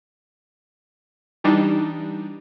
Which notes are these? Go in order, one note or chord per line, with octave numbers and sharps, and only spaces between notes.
E3 G3 D4 D#4